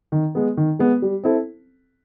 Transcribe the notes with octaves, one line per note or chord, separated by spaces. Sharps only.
D#3
G#3 B3
D#3
G#3 B3
G3
C4 E4 A4